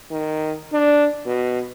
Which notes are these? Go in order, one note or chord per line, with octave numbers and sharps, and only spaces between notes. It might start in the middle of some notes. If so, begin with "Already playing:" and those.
D#3
D4
B2